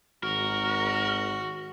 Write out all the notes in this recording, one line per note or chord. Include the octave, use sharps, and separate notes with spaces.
G#1 F#4 A#4